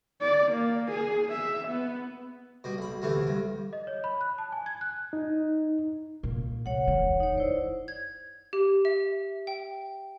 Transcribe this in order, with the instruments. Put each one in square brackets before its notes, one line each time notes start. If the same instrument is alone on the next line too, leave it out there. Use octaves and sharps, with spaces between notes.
[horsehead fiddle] D5
A#3
G#4
E5
B3
[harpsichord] B2 G3
B1 B5
D2 C3 E3 A3
G2
[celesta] D#5
C#5
B5
F#6
A5
G#5
G#6
F#6
[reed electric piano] D#4
[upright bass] A#2
[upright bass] C2 [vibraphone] C#5 F#5
[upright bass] E1 D#3
[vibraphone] D#4 C#5
[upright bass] F#2 [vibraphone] E4 C5 D5
[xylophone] G#6
G4
E5
G5